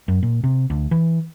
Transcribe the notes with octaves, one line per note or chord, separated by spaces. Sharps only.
F#2
A#2
C3
D2
E3